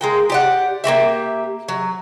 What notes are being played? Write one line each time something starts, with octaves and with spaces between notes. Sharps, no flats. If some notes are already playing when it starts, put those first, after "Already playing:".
G#3 A#3 G5
G4 D5 F#5
A#3 F#4 G4 E5
F#3